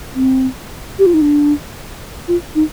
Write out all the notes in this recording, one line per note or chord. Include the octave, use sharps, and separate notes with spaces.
C4
G4
F4
D#4
D4
F4
D#4